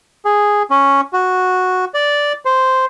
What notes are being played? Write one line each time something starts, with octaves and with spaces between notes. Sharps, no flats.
G#4
C#4
F#4
D5
C5